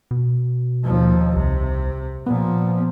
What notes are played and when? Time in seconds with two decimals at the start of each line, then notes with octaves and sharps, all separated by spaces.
0.11 B2
0.84 D#2 F3
1.36 C2 C3
2.26 A#2 F3 B3